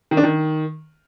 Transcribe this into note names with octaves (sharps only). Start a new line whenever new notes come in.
D#3
D4
D#3